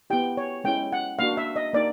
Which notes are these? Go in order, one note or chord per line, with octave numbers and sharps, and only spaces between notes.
B3 E4 G4 G5
C#5
G#3 C#4 E4 G5
F#5
A#3 D4 F#4 F5
E5
D#5
A#3 D#4 D5